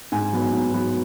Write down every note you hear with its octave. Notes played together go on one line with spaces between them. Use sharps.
G#2 G#5
F#3 B3
G#2
F#3 B3